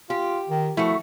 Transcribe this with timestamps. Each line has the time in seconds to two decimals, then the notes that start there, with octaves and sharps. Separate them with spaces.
0.10 F4 G4
0.50 D#3
0.77 F3 A3 E4 F#4